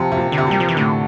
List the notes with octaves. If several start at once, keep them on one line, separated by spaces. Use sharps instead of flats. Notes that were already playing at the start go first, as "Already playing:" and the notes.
Already playing: C3 F3
C3
A#2
D3
C3
A#2 G3
F3
E3
A2 D3